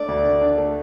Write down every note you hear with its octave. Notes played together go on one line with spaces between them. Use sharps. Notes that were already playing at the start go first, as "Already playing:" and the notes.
Already playing: A3 D4 D5
D2
D3
D4
A3